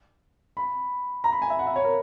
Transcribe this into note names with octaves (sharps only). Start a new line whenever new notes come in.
B5
A#5
B5
G#5
E5
F#5
E5
C#5
A#4